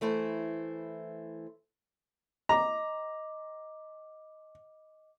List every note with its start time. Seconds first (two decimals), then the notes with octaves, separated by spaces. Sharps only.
0.01 E3 A3 E4 C5
2.49 D#5 A#5 D6